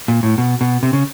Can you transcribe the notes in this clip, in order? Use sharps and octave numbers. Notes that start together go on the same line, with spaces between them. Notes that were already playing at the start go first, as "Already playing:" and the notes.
A#2
A2
B2
B2
C3
C#3